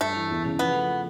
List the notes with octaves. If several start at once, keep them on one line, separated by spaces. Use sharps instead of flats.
G2 A3
E3
E2
C#3
F3 B3
A3